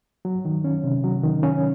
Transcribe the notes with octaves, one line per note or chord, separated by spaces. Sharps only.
F#3
D#3
C#4
C3
F#3
D#3
C#4